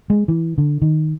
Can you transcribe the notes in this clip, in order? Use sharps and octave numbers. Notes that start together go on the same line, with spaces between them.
G#3
E3
D3
D#3